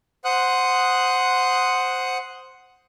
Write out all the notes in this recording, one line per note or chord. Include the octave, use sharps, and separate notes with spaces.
C5 F#5 D#6 F#6